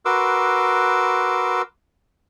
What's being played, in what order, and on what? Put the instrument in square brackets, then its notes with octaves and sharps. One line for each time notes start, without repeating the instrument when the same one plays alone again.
[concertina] F#4 A#4 B4 C6 D6 E6